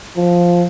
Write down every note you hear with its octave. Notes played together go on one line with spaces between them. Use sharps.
F3